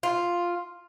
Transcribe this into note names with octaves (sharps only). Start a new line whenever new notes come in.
F4